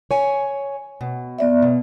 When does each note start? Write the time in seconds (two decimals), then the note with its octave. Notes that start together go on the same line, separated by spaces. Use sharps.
0.11 C#5 G#5
1.01 B2
1.39 B3 D5 E5
1.62 B2